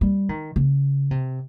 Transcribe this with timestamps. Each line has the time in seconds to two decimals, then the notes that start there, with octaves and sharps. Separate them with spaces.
0.01 G3
0.29 D#3
0.56 C#3
1.11 C3